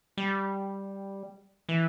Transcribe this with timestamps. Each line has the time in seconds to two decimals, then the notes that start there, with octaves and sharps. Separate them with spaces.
0.17 G3
1.69 E3